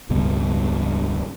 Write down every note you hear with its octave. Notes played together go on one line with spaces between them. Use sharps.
E1 C#2 G2 B2